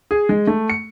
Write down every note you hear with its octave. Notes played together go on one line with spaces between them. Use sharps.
G#4
G#3
A3
C#7